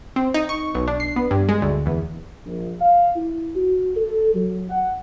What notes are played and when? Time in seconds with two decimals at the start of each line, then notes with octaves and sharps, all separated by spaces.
0.16 C4
0.34 D#4
0.49 C#6
0.75 B1
0.88 D4
1.00 C7
1.16 B3
1.31 G2
1.49 G#3
1.62 D2
1.86 E2
2.46 A#1
2.80 F5
3.16 E4
3.56 F#4
3.96 A4
4.34 F#3
4.70 F#5